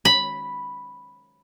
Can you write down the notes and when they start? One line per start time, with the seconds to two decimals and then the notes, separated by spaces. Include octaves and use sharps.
0.05 B5